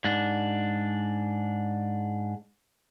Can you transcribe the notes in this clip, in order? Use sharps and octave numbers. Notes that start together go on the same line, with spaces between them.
G#2 D4